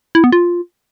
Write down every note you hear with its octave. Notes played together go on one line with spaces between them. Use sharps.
E4
B3
F4